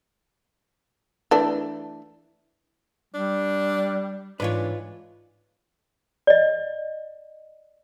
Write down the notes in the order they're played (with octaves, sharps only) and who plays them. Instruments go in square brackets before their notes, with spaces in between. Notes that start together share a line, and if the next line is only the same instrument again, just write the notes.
[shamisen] E3 A3 D4
[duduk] G3 [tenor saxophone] D4
[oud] G#2 E3 C#5 [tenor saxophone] D4 [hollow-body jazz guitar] F4 B4
[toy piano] D5 D#5